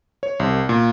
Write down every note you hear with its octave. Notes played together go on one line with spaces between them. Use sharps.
C#5
C2
A#2